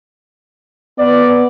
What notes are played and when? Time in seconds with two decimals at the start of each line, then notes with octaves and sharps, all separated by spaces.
0.98 B3 D5